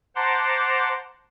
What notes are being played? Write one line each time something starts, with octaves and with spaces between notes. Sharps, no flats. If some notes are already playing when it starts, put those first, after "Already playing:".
C5 F#5 A5 A#5 C6 D6